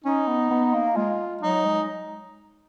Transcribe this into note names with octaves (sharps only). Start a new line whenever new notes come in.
C#4 D#4
B3
B3
A#3
G#3 F4
F#3 D#4
G#3